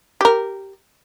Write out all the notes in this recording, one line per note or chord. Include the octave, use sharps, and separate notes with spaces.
G4 A#4